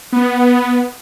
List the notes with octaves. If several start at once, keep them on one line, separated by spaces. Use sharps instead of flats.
B3